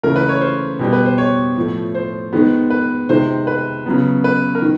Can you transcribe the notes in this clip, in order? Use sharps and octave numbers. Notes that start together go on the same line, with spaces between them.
C#3 E3 A3 A#4
B4
C#5
C5
B2 G3 B3
B4
C5
C#5
A2 F3 A3
C5
D#3 G#3 B3
B4
C3 D#3 G#3 C5
B4
C#3 F#3 B3
B4
A#4
D#3